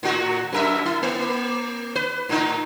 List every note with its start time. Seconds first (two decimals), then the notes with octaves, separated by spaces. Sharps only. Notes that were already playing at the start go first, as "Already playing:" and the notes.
0.03 A2 F#4
0.53 F#2 A#4 E5
0.85 E4
1.03 A#3
1.95 B4
2.29 A2 D#4